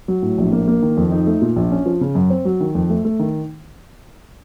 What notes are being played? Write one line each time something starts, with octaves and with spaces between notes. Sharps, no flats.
F#3
A2
A#1
A#3
A#3
D#3
F2
D#4
A3
A#2
A#1
C#4
F3
C#3
F#2
C4
F#3
D#3
F2
A3
A3
D#3